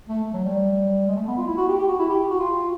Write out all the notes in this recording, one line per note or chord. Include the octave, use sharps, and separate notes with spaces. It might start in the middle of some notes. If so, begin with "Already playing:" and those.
A3
A3
F#3
G3
G#3
A3
B3
F4
E4
F#4
G4
G4
F#4
E4
G4
G4
F#4
F4